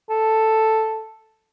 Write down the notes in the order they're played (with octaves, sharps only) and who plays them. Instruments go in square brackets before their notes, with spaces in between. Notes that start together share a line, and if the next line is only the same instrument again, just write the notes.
[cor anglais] A4